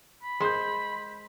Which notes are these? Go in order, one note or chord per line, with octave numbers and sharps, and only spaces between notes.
B5
G#3 C5 C6 G6